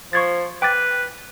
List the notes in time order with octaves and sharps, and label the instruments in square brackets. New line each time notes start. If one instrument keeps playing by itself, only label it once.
[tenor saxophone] F3 [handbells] C#6 G#6 A6
[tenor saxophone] B4 [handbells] G5 D6 A6